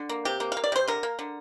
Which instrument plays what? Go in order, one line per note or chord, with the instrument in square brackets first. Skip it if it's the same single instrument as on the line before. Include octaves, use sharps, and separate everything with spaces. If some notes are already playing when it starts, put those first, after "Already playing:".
Already playing: [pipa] D3
A#3
C3 G4
A#3
A#3 F5
D5
C3 C5
D3 A#4
A#3
D3